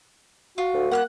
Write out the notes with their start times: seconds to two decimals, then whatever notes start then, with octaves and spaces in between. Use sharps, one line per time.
0.58 F4 F#4
0.74 D2
0.91 A#3 F#5 F6 F#6